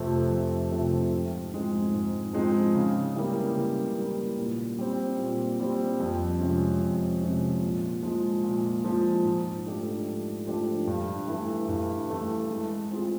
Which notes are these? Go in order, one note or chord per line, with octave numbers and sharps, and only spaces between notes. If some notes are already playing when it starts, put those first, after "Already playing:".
Already playing: F2 C3 F3 A3 C4
F2
C3 F3 A3 C4
G#2
F3 G#3 C4 D#4
G#2
F3 G#3 C4 D#4
C#3
E3 G3 A#3
C#3
E3 G3 A#3
A#2
G3 C4
A#2
G3 C4
F2
C3 F3 G#3 C#4
F2
C3 F3 G#3 C#4
A#2
F3 G#3
A#2
F3 G#3
G#2
F3 A3 D4 G4
G#2
F3 A3 D4 G4
G2
E3 A3
G2
E3 A3
G#3
C4 F4 G#4